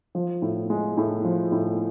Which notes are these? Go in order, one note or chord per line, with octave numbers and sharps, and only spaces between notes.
F3
A2
G#3
A2
F3
A2